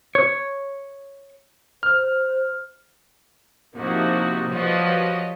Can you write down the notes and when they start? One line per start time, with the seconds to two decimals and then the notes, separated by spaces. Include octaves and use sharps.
0.15 C#5
1.83 C5 F6
3.75 C3 F3 A#3 D#4 E4 F#4
4.49 F3 G3 F#4 B4 C#5 D#5